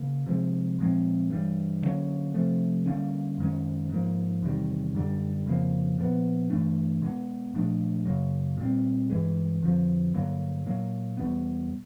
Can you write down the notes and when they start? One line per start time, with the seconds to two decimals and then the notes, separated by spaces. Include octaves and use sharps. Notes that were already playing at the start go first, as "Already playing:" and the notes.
Already playing: C#3 A#3
0.26 C3 F3 G#3
0.79 A#2 F3 G#3 C4
1.30 G2 E3 G3
1.83 D3 F#3 A#3 C#4
2.34 C3 F3 A3
2.86 D3 G3 A#3 C#4
3.38 F#2 D#3 G#3 C#4
3.90 G#2 F3 A#3
4.42 E2 C3 D#3 G3
4.95 F#2 D3 G3
5.46 F2 C#3 F3 A#3
5.98 A#2 F3 G#3 B3
6.50 G2 E3 A3 D4
7.02 B2 G#3 B3
7.54 A#2 F3 A3 D4
8.05 F#2 C#3 F#3 A#3
8.58 A#2 G3 C4
9.10 G2 E3 G#3
9.62 F2 D3 F3
10.14 G2 D3 F#3 A#3
10.66 A#2 F#3 A#3
11.17 E2 B2 G3 B3